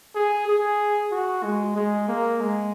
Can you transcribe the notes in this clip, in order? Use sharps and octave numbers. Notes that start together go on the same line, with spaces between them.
G#4
G#4
F#4
G#3
G#3
A#3
G#3